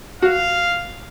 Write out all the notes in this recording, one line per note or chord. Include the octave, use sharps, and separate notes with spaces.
F#4 F5